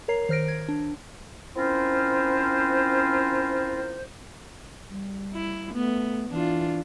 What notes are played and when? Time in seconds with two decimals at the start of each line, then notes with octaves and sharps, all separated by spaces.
0.08 A#4 C#5 A#5 C7
0.29 D#3 C5 F6 A#6 D7
0.48 G#6
0.69 D4
1.56 C4 C#4 E4 F4 A#4 C5
4.90 G3
5.34 E4
5.74 A3 B3
6.31 E3 D4 F4